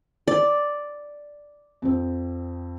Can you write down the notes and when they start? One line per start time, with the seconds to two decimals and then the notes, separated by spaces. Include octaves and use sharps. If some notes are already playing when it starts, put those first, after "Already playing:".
0.28 D5
1.82 F2 C4